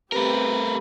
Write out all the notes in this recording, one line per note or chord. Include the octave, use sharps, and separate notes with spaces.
A3 C4 G4 A#4 B4 A#5 B5